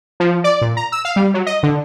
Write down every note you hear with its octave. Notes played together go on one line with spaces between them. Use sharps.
F3
D5
A#2
A#5
E6
F5
G3
F#3
D#5
D3